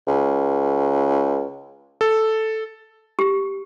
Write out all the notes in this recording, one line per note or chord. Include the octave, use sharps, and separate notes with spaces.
C#2
A4
G4